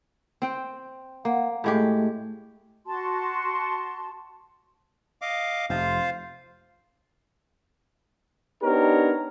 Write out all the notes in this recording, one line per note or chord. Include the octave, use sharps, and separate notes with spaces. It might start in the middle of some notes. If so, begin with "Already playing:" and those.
C4 G5
A#3 F#5
A2 G#3 A3 G4
F#4 A5 C6
D#5 F5 D6
F1 F4 C5 F5
B3 D4 D#4 G4 A#4 C#5